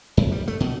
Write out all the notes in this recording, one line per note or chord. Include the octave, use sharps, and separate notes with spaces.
F#2
G3
A3
B2